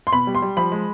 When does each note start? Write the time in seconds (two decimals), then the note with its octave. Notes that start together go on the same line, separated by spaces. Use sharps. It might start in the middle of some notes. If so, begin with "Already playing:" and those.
0.07 C6
0.12 B2 B5
0.27 G3
0.35 C6
0.42 G3
0.57 F3 B5
0.72 G#3